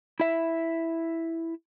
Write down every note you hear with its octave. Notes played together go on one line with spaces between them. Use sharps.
E4 E5